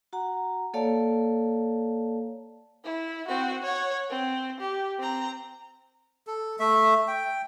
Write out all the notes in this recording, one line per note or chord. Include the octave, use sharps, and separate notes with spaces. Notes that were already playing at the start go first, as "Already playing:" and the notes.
F#4 F#5 A#5
A#3 A4 C#5 D5 F5 A5
E4
C4 F#4
C#5 F#5
C4
G4
C4 A#5
A4
A3 E5
G5